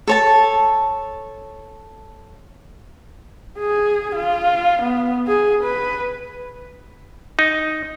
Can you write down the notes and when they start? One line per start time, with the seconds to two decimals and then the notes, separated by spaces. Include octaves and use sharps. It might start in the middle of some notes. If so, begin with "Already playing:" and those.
0.07 A4 C#5 A5
3.59 G#4
4.16 F4
4.82 B3
5.28 G#4
5.64 B4
7.39 D#4